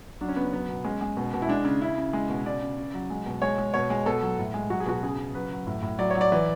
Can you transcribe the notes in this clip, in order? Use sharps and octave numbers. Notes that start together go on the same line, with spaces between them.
F#3 D4
C#4
C#3 B3
C#4
F#3 B3
B2
G#3 C#4
G#3
B2
B2
E4
G#3 D4
C#3
C#3 E4
C#3
G#3
B2
C#3 D5
C#3
C#3
F#3
G#3
B2
G#3 C#5
G#3
B2 C#5
G#3
B2 A4
F#3
A2
G#3
F#3 F#4
G#4
B2 F#4
C#3 G#4
C#3
F#3 B4
F#3
A2
A2
F#3 D5
F#3 C#5
D5
E3